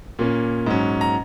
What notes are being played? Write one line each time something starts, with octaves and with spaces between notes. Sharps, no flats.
A#2 A#3 C#4
G#2 F#3 C#4
A#5